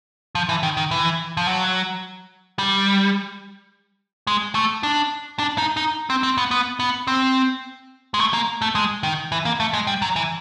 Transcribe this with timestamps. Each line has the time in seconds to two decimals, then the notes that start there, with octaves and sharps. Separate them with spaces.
0.35 F3
0.49 E3
0.63 D#3
0.77 D#3
0.91 E3
1.37 F3
1.47 F#3
2.59 G3
4.27 G#3
4.55 A3
4.83 D4
5.39 D4
5.58 D#4
5.77 D#4
6.10 C4
6.23 C4
6.38 B3
6.51 B3
6.80 B3
7.07 C4
8.14 G#3
8.19 A3
8.33 A#3
8.62 A3
8.75 G#3
9.03 D#3
9.32 E3
9.45 A#3
9.60 A3
9.73 G#3
9.87 G3
10.02 F#3
10.16 E3